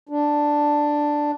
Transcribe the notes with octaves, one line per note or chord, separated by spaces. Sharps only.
D4